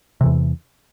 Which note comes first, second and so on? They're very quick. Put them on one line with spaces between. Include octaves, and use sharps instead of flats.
C3 E3 E2